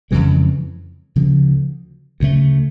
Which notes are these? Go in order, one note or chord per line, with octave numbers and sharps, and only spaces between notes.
F2 C#3 E3 G#3
D2 C#3 F3
D2 C#3 F#3 A3